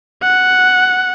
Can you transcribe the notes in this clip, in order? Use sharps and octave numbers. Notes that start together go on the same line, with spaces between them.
F#5